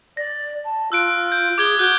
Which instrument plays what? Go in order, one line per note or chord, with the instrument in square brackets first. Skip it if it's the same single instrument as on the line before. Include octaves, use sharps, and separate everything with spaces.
[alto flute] D5 [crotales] A#6
[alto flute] A5
[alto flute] F4 [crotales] E6 F#6 D7
[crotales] G6
[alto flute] G#4 [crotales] D6 G#6 G7
[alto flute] F#4 [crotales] F#6 G6 G7